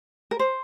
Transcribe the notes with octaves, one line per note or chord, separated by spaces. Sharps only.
A#4
C5